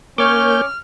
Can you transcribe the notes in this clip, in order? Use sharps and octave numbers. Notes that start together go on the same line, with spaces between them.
A#3 C#4 C#5 C#6 D6 F6 G6